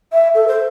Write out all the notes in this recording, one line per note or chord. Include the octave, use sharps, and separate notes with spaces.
E5
A4
C5